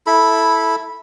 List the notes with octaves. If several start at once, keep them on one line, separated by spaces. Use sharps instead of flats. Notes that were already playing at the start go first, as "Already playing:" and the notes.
E4 A4 B5